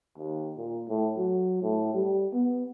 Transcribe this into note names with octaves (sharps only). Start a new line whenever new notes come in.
D#2
A#2
A2
F#3
A2
G3
B3